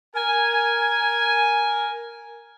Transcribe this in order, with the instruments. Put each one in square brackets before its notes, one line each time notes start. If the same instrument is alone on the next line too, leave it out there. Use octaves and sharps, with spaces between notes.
[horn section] A#4 G#5